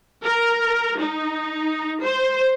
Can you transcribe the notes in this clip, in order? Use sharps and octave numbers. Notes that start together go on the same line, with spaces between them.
A#4
D#4
C5